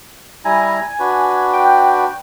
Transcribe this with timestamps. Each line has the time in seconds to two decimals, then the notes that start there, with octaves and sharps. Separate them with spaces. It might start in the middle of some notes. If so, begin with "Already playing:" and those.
0.45 G3 E4 G#5 A#5
0.99 D4 F#4 B4
1.53 G5